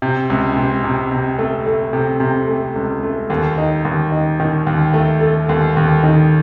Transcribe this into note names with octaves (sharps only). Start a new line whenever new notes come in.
C3
C#2
C3
C3
C3
A3
A3
C3
C3
A3
C#2
A3
D#2
D#4
D#2
D#4
D#3
D#2
A3
A3
D#2
D#2
D#3